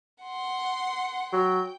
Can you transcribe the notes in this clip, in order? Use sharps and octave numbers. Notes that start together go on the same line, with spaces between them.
F#5 C6
F#3 G5